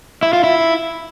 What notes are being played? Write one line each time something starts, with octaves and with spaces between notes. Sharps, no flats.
E4
F4
E4